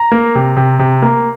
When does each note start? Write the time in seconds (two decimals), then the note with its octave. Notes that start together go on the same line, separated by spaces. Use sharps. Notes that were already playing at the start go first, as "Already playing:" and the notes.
Already playing: A#5
0.12 A#3
0.35 C3
0.57 C3
0.79 C3
1.02 A#3